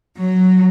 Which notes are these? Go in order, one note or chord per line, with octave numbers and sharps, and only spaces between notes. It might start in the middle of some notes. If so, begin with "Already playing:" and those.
F#3